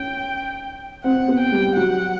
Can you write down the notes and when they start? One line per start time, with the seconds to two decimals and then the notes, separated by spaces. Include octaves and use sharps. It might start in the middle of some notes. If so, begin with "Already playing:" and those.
Already playing: C#4 G5
1.04 C4 F#5
1.28 B3
1.40 G5
1.52 G3
1.76 F#3 F#5